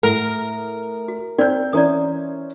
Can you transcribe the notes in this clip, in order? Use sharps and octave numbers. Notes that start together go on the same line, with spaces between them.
A2 A4 A#4 F#5
F#4
C4 D#4 F#4 D5 G6
E3 C#4 C5 D5 A#5 D#6